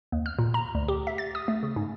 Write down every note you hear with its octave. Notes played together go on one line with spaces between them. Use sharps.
D#2
F6
A#2
A#5
D2
G4
E5
A6
D#6
A3
C#3
G#2